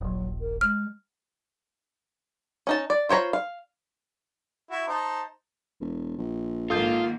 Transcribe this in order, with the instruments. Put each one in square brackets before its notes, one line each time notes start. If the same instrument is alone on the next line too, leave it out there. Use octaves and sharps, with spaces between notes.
[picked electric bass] D#1 A#1 [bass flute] F#3
[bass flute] A#4
[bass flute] G#3 [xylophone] F6
[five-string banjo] C#4 D#4 A5
D5
F4 C5 C#5 A#5 B5
F5
[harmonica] E4 F#4
D#4 C5 A5
[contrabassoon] E1
A#1
[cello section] G#2 D#3 A#3 [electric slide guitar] F4 [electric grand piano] A4 D#6 G6